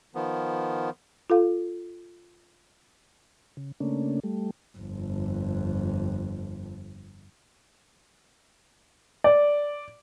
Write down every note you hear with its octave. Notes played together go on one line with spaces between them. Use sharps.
D#3 F3 B3
F4 A4 F5
C#3
C#3 A3 A#3 C#4 D4
G3 A3
G1 F2
D5